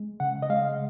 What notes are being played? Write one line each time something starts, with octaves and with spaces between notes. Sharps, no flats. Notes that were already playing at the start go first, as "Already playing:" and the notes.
Already playing: G#3
C#3 F#5
D#5
G#3 F5